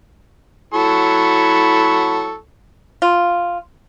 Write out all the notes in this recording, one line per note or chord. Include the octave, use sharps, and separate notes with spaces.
F#3 E4 A4 C#6
F4